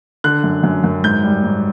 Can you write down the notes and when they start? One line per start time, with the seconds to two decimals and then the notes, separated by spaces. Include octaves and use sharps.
0.24 D3 F#6
0.44 F#2
0.63 F#2
0.84 F#2
1.03 G#2 G6
1.23 G3
1.44 G#2